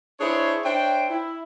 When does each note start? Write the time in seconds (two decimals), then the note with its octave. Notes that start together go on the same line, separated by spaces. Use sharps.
0.20 D4 E4 G#4 C5 C#5
0.64 D4 C5 C#5 E5 G5
1.10 E4